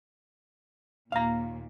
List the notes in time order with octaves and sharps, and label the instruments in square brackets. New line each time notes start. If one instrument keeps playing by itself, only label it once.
[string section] D#2 A#2 [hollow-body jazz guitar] F5 A#5